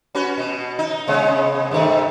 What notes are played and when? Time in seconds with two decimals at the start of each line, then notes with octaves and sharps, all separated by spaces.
0.15 C#4 F#4 B4
0.38 B2
0.79 D#4
1.08 C3 G#3 B3
1.71 G2 D#3 A3